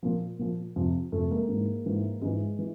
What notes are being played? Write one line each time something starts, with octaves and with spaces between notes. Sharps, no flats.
A#2 F3
A#2 F3
F2 C3 F3
F2 C3 F3 A3
G#3 A#3
G#2 E3
G#2 E3
G#2 E3 G#3
E3